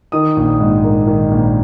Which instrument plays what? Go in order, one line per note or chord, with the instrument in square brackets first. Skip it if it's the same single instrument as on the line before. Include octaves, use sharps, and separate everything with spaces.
[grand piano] D#3 D#6
A#1
G#2
A#3
D#3
A#1